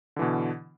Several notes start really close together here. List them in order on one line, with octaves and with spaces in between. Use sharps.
D3 E3 B2